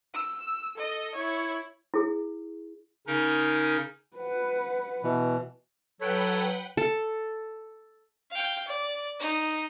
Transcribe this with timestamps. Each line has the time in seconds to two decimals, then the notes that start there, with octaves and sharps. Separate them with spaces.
0.14 E6
0.76 A4 D#5
1.15 E4 C#5
1.94 E4 G#4
3.07 C#3 C#4 D#4 A#4
4.17 B4 F#5
5.04 B2 E3
6.01 F#3 A4 B4 C#5 F#5 G5
6.77 A4
8.31 F5 G5
8.67 D5
9.20 D#4